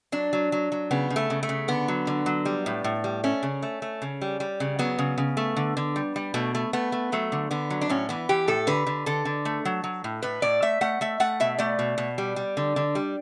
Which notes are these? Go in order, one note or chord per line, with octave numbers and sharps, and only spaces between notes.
F#3 D4
F#3
F#3
F#3
C#3 B3
C#3
A3
C#3
A3
C#3
D3 B3
F#3
D3
F#3
G3
A2
A2
G3
A3 C#4
C#3
A3
A3
C#3
G3
G3
C#3
F#3 B3
C#3
C#3
A3
D3
D3
G3
G3
B2 A3
A3
A3 B3
A3
F#3 A3
D3
D3 B3
F#3
D4
A2 C#4
E3 B3
E3 G4
A2 A4
D3 B4
D3
D3 A4
D3
A3
F#3
F#3
A2
A2 B4
A2 D5
A3 E5
A3 F#5
A3 E5
A3 F#5
B2 E5
A3 D5
B2
B2
G3
G3
D3
D3
G3